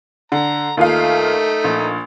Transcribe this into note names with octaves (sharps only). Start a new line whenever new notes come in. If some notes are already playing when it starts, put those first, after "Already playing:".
D3 A#5
D#2 A3 D#4 F4 F5
A#1